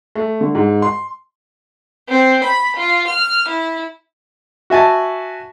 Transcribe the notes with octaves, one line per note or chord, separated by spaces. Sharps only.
A3
D3
G#2
C6
C4
B5
F4
F6
E4
F#4 E5 G#5 A5